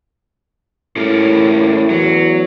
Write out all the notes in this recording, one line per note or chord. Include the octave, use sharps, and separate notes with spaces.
A2 C#4 G4 A#4
E2 F#3